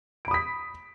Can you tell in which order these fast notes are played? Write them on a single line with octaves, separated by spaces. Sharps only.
D7 B5 D#6 B6